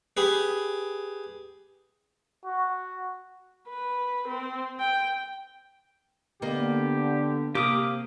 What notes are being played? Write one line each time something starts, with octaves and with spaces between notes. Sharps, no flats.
G4 G#4 B4
F#4
B4
C4
G5
D3 A#3 B3 G4 D#5
C3 A#3 G4 F5 D6 D#6